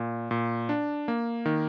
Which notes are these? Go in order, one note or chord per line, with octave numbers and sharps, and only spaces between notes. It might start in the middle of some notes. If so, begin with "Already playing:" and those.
Already playing: A#2
A#2
D4
A#3
D#3